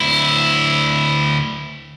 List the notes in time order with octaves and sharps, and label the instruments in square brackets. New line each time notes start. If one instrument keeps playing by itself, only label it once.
[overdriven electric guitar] D2 E4